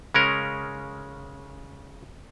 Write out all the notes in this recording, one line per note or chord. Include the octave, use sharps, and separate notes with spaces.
C#3 G#3 C#4 A#4